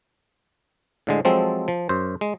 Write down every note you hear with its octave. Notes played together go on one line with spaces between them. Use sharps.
A2 D3 G#3
F3 F#3 G#3 C4 A4
F3
F#2 C5
G#3